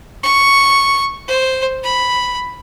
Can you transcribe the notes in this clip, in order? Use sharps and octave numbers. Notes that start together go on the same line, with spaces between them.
C#6
C5
B5